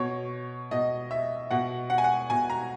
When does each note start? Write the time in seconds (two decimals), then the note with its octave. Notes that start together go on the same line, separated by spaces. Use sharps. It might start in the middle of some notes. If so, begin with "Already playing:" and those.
Already playing: B2 C#5
0.71 B2 D#5
1.11 E5
1.51 B2 F#5
1.90 F#5
1.98 G#5
2.04 F#5
2.30 B2 G#5
2.50 A#5